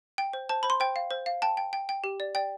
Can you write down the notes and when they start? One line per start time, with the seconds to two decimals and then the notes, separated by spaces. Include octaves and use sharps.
0.18 G5
0.33 C5
0.49 C5 A5
0.63 C5 B5
0.70 C6
0.80 C5 G5
0.96 F5
1.11 C5
1.26 F5
1.42 G5 A5
1.57 G5
1.73 G5
1.89 G5
2.04 G4
2.20 D5
2.35 D5 G5